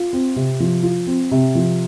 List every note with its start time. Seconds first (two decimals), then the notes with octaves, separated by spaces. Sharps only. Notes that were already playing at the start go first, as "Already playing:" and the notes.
Already playing: F4
0.13 C4
0.36 C3
0.60 F3
0.83 F4
1.07 C4
1.31 C3
1.55 F3